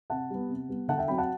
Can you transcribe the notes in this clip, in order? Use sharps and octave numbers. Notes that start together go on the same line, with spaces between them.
C3 F#5 A5
G3 B3
C3
G3 B3
D3 F#5 A5
E5 G5
F#3 C4 G5 B5
F#5 A5